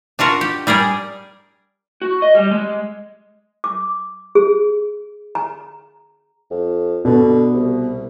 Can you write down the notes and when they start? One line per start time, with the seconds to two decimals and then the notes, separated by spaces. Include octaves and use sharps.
0.19 D4 F4 F#4 A#4
0.41 G4
0.67 G3 G#4 A#4 D5
2.02 F#4
2.22 D#5
2.35 G3
2.51 G#3
3.64 D6
4.35 G#4
5.35 A#5
6.51 F2
7.05 B2 D3
7.54 C2